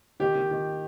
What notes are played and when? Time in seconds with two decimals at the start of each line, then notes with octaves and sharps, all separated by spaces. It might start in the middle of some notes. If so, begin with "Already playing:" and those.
0.20 D#3 G4
0.35 D#3
0.51 D#3